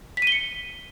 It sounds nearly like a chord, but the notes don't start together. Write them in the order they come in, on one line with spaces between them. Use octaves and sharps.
B6 D#7 G7 C#7